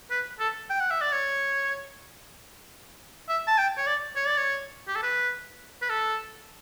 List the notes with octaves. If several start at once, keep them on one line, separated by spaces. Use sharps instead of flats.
B4
A4
G5
F#5
E5
D5
C#5
E5
A5
G5
C#5
D5
C#5
D5
C#5
G4
A4
B4
B4
A4